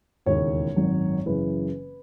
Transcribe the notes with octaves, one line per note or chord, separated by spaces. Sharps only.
E1 D#2 C#3 E3 C#5
G#1 F#2 D#3 F#3
F#1 F#2 C#3 E3 B4